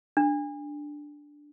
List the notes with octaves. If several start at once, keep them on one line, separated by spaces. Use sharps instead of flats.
D4